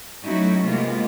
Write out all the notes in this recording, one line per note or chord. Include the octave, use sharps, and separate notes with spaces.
F#3 A3 C#4 D#4 E4 F#4
C3 G#3 A#3 B3 F4